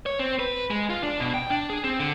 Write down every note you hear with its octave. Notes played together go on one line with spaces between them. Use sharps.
C#5
C4
B4
G#3
F4
D4
B2
G5
D4
G#4
C4
D3